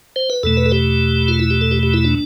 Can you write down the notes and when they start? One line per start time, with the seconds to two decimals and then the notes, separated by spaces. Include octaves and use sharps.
0.16 C5
0.30 B4
0.43 E2 B2 A3 A4
0.57 B4
0.66 A4
0.72 G4
1.28 F4
1.39 E4
1.51 G4
1.61 A4
1.71 G4
1.83 G4
1.94 E4
2.04 D4